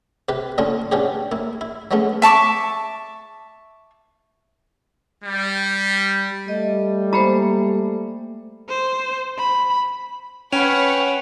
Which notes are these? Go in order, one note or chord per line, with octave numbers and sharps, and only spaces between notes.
C3 G4 B4
A#2 D3 A#3 C#4 D4 F4
B2 C#4 D4 G4 G#4
A#3 E4
E4
F#3 G#3 A3 B3 C#4
E5 A5 C#6 D6
G3
G3 A3 D#5
G#3 A#3 C5 A#5 B5
C5
B5
C#4 B4 C#5 F#5 G5 F6